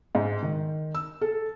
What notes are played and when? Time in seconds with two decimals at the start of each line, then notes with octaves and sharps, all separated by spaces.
0.15 G#2
0.43 D#3
0.95 E6
1.21 A4